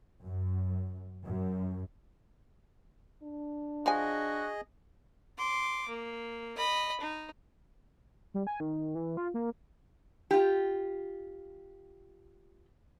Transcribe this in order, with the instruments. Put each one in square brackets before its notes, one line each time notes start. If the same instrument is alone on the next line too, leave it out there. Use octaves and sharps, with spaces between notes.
[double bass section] F#2
F#2
[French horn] D4
[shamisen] F3 G#5 [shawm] F#4 [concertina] G#4 D#5
[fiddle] C6 D6
A#3
D#5 B5
D#4
[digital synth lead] G3
G#5
D#3
E3
F4
A#3
[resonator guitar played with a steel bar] F4 G4